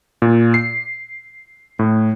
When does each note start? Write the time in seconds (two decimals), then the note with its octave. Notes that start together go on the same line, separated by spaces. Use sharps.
0.22 A#2
0.54 C7
1.79 A2